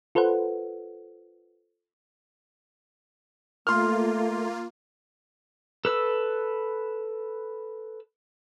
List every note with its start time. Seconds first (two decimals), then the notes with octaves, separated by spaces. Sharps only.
0.15 F4 A4 B4 C5 F#5
3.67 A3 A#3 F4 C6 F6
5.85 A4 B4 E6